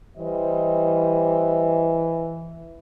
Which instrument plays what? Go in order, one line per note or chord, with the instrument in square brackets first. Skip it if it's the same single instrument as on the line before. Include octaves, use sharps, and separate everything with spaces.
[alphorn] E3 [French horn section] G3 C5 D#5